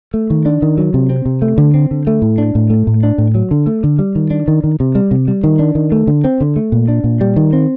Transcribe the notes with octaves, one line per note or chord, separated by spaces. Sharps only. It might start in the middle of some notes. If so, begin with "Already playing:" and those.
A3
D#3
D4
D#3
F#3
C3
C4
C3
A3
D3
C4
D3
A3
A2
D4
A2
A3
A2
D4
A2
F#3
D3
A3
D3
G3
D#3
D4
D#3
D#3
C3
G3
C3
G3
D#3
D4
D#3
A3
D3
C4
D3
A3
A#2
D4
A#2
G3
D#3
C4